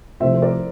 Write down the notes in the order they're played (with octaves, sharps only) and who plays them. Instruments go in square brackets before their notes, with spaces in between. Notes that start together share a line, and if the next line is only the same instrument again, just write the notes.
[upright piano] C2 C3 F3 A3 [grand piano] C5 E5
[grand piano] C5
A#4 D5